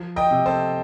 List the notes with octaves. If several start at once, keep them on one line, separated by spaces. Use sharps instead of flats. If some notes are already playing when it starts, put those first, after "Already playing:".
Already playing: F3
D#5 G5
C3
A4 C5